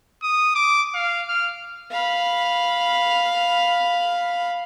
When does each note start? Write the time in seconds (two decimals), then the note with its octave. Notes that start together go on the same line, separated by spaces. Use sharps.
0.22 D#6
0.55 D6
0.94 F5
1.28 F6
1.91 F5 B5